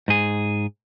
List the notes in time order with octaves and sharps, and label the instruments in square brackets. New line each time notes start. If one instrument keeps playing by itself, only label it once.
[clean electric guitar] G#2 G#4